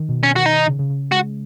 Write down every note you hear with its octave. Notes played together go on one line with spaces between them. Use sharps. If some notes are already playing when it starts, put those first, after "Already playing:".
Already playing: D#3
B2
B2 C#4
D#3 F#4
D#4
D#3
C#3
C#3
C#3
G#3 F#4